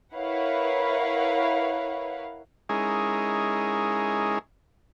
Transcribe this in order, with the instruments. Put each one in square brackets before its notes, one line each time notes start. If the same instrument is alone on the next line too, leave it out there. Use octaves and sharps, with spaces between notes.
[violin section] E4 A#4 B4 C#5 F5 F#5
[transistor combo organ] G#3 C#4 D#4 E4 G#4 A#4